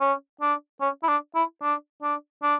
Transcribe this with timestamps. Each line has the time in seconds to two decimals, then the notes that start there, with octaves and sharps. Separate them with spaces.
0.01 C#4
0.41 D4
0.81 C#4
1.03 E4
1.08 D4
1.35 E4
1.62 D4
2.02 D4
2.43 D4